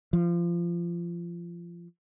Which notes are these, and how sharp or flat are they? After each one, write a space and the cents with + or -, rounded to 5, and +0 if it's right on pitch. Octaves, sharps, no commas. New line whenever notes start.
F3 -25